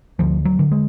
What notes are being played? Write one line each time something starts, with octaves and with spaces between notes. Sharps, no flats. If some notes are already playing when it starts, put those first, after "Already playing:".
D2 F3
F#3
D3
G#3